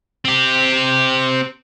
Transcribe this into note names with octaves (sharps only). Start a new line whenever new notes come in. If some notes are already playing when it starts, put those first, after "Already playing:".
C4 G4